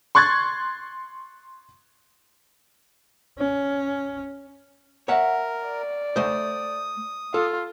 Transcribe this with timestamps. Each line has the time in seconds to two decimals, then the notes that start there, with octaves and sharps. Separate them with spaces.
0.15 C6 C#6 F#6 G#6 A6
3.38 C#4
5.08 A#4 C#5 E5 F#5
5.65 D5
6.16 A3 C5 D#6
7.34 F4 A4